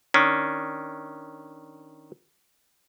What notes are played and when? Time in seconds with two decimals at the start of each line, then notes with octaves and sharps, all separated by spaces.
0.14 D#3 C#4 D4